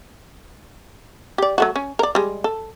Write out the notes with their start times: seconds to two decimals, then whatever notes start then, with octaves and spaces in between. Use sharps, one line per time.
1.38 G4 D5
1.58 F#3 A3 F#4
1.76 C#4
1.99 A#4 D5
2.15 G3 G#3
2.44 A4